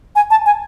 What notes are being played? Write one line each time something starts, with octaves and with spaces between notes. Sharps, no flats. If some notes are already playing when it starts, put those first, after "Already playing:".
G#5
A5
G#5